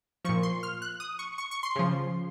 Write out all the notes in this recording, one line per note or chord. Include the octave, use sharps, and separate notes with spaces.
A#2 F3 C#6
C6
F6
F#6
D#6
C#6
C#6
C#6
C6
C#3 F3